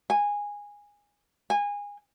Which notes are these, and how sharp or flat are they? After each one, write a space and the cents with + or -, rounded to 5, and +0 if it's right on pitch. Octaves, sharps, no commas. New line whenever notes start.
G#5 -15
G#5 -25